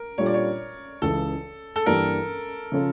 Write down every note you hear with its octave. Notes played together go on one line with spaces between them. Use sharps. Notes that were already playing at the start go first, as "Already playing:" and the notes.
Already playing: A#4
A#2 G3 D4 F4 A4 C#5
D5
C#5
C#2 C#3 E3 A4
A4
G2 E3 A#3 D4 G4 A#4
C#3 F3 C#4 F4 A4